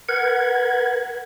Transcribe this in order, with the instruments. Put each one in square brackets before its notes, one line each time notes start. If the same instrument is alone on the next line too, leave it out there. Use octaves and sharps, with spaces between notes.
[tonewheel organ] A#4 B4 F#5 G#6